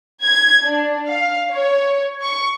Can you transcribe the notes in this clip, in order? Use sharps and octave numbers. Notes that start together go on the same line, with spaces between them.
G#6
D4
F5
C#5
C#6